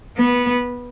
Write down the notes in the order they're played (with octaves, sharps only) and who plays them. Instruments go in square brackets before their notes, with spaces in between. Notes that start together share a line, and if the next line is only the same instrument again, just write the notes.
[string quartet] B3